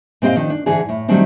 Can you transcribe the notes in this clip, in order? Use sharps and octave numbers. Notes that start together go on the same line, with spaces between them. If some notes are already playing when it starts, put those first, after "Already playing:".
A#2 C4 G4 D#5 F5
D#3 F3 D4
D4
G#2 D3 E3 D4 G#4
A2
D#3 F#3 G3 A3 C4 D4